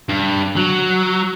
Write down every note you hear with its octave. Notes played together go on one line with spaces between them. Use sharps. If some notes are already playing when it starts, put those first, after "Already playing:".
G2
F#3